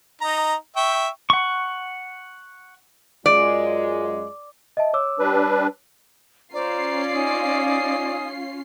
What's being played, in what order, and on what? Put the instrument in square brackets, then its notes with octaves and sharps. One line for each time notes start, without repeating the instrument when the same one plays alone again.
[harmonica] D#4 A#5
E5 G5 C#6
[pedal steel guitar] F#5 C#6
[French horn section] F#2 G#3 F4 [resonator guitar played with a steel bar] D5
[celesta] D#5 E5 A5
C#5 D6 E6
[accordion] G3 D4 B4
[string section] C#4 F4 C7 [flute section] C5 A#5 [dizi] D5
[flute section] D#4 G#5 D#6